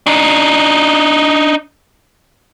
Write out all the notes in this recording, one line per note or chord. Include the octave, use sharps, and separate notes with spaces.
D4 D#4